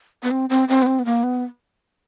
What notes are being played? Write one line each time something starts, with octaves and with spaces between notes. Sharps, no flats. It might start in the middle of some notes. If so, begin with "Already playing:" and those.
B3
C4
C4
C4
B3
C4
B3
A#3
B3